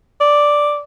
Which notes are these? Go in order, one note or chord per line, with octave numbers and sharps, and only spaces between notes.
D5